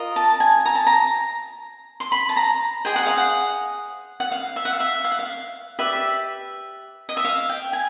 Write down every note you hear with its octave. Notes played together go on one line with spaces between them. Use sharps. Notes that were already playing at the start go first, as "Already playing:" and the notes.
Already playing: F4 A#4 D#5
A5
G#5
A#5
A5
A#5
C6
B5
A5
A#5
G#4 C5 D#5 G5
F#5
F5
F#5
F#5
F5
E5
F#5
F5
E5
F5
F#5
F5
G4 B4 D5 E5
D#5
E5
F5
G5
G#5